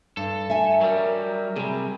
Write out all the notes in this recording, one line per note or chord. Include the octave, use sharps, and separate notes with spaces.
G2 A4
E5 G#5
F#3 G3 A#4
C3 G3 G#4